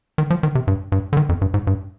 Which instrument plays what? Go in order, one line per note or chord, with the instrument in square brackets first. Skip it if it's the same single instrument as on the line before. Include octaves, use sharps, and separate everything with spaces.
[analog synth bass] D#3
F3
D#3
C3
G2
G2
D3
D#3
F2
G2
G#2
G2